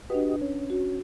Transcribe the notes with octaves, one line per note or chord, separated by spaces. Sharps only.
D4 F#4 G4 B4 D#5
C#4
F#4